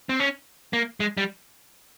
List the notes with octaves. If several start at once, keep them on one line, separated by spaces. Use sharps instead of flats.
C4
C#4
A#3
G#3
G3